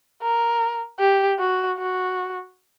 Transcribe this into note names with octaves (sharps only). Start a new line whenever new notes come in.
A#4
G4
F#4
F#4